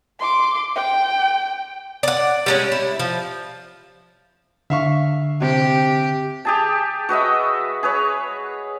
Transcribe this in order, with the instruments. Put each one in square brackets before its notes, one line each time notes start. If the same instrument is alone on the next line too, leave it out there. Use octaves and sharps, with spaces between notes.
[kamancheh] C6 D6
G5
[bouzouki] D5 F#5
G3 G#3 C#4
E4
F3
[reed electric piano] D3 [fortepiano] E5 F5 C#6
[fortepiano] C3 [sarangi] G4
[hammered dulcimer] G4 G#4 A5
F#4 B4 D#5 E5
G#4 B4 C#5